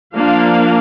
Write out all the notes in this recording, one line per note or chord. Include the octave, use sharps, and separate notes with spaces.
F3 A#3 D4 F5